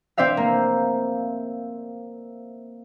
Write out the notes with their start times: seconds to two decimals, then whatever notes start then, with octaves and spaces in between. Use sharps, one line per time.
0.17 C4 C5 D5 E5 F5
0.37 A#3